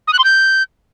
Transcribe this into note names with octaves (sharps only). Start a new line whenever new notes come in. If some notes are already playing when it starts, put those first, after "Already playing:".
D#6
F#6
C6
G6